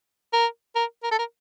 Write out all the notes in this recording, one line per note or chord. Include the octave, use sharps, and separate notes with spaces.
A#4
A#4
A#4
A4
A#4